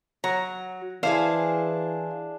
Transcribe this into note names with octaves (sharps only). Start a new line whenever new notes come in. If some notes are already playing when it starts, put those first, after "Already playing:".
F#3 A#5
E3 D4 E4 G#4 C5 F5 A5